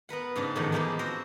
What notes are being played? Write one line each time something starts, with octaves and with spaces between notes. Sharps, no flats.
B3 A#4 B4 F#5
G#2 C#3 D4
E2 A2 D#3 F3 F#5
F3 G#3 A#3 B3 E4 G4
C4 F#4 A#4 C5